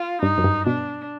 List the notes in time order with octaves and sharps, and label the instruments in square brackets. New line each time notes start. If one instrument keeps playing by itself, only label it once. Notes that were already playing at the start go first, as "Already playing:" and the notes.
Already playing: [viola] F4
[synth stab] G2 [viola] D#4
[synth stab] F#2
G2
[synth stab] B2 [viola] D4